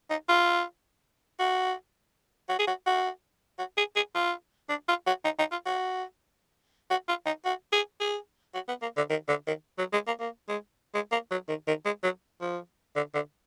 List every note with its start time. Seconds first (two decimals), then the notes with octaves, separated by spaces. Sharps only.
0.10 D#4
0.29 F4
1.39 F#4
2.49 F#4
2.59 G#4
2.67 F#4
2.86 F#4
3.59 F#4
3.77 G#4
3.96 G#4
4.15 F4
4.69 D4
4.88 F4
5.07 F#4
5.24 D#4
5.39 D#4
5.51 F4
5.66 F#4
6.90 F#4
7.08 F4
7.26 D#4
7.45 F#4
7.73 G#4
8.00 G#4
8.54 F#4
8.68 B3
8.82 A#3
8.97 D3
9.10 D#3
9.28 D3
9.47 D#3
9.78 F#3
9.93 G#3
10.07 A#3
10.20 A#3
10.48 G#3
10.94 G#3
11.12 A#3
11.31 F#3
11.48 D#3
11.67 D#3
11.85 G#3
12.04 F#3
12.41 F3
12.96 D3
13.14 D3